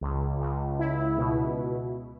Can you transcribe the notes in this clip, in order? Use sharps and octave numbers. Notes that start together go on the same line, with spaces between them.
C#2
C#2
E4
B2